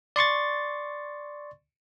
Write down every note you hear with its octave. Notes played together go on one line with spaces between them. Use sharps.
D5 C6 C#6 A6